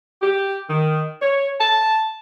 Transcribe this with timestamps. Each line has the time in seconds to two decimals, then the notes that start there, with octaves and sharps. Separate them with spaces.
0.22 G4
0.69 D#3
1.22 C#5
1.61 A5